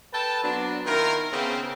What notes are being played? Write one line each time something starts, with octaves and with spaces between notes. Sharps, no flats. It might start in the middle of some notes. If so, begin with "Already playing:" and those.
A4 B4 G5 A5
F#3 B3 C4 D4
D#3 E4 F4 A#4
C#3 B3 C4